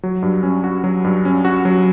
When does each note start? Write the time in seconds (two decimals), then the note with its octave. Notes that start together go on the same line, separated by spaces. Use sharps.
0.03 F#3
0.23 G2
0.43 C#4
0.64 F#4
0.84 F#3
1.04 G2
1.25 C#4
1.45 F#4
1.65 F#3